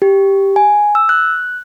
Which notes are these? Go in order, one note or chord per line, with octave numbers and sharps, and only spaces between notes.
G4
G#5
E6
F#6